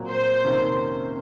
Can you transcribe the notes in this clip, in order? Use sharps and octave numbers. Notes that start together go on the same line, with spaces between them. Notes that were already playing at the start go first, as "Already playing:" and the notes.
Already playing: A#2 F#3 C4
C5
F2 C3 D#3 A#3 C#4